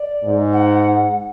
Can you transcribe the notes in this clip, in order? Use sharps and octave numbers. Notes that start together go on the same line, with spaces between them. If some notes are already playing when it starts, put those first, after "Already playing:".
Already playing: D5
G#2
F#5